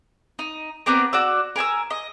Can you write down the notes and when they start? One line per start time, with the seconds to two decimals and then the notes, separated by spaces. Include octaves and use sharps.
0.39 D#4
0.86 B3 C4 D4 A#4
1.13 F#4 D5 E6
1.56 A#4 G#5 A5 E6
1.90 D#5